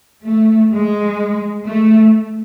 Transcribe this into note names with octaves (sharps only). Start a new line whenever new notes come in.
A3
G#3
A3